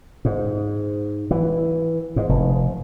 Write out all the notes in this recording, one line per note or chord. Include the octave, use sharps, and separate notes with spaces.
G#2
E3
G#2
F1